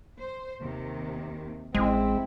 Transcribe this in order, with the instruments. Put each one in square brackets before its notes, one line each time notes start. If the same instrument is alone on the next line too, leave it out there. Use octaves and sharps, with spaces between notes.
[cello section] C5
D#2 C3 D#3
[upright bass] A1 [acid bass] G#3 [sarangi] C4 [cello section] E4